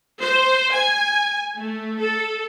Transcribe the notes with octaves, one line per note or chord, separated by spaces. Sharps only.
C5
G#5
A3
A4